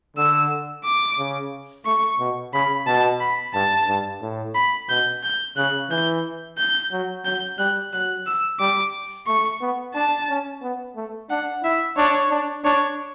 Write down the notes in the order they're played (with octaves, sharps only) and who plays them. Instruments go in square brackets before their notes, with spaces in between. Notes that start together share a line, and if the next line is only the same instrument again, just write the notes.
[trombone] D3 [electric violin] E6
[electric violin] D6
[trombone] C#3
[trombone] A3 [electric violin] C#6
[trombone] B2
[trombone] C#3 [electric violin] B5
[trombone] B2 [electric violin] A5
[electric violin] B5
[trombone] G2 [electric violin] A5
[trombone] G2
A2
[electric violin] B5
[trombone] B2 [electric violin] G6
[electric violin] G6
[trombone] C#3 [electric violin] F#6
[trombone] E3 [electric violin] G6
[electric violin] G6
[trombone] F#3
[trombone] F#3 [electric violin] G6
[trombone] G3 [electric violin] F#6
[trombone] F#3 [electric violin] F#6
[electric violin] E6
[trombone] G3 [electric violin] D6
[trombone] A3 [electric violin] C#6
[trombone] B3
[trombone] D4 [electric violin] A5
[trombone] C#4
B3
A3
[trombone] D4 [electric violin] F#5
[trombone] E4 [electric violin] E5
[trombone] D4 [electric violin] C#5
[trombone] D4
[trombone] D4 [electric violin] C#5